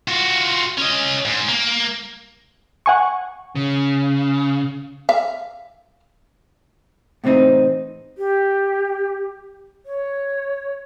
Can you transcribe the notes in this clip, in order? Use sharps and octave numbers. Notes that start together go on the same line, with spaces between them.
F4 F#4
C#4 D#5
G#2
A#3
F#5 G#5 C#6
C#3
E5 F5
A2 C3 E3 C4 D#4
G4
C#5